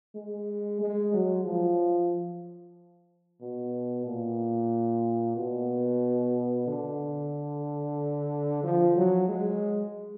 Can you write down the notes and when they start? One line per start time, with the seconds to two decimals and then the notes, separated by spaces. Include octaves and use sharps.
0.15 G#3
0.81 G#3
1.13 F#3
1.45 F3
3.41 B2
4.06 A#2
5.36 B2
6.67 D3
8.63 F3
8.96 F#3
9.28 G#3